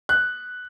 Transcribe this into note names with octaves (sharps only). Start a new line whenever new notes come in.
F#6